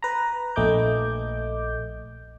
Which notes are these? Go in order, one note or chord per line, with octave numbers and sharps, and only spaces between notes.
B4 A#5
A#1 A3 D#5 D6 G6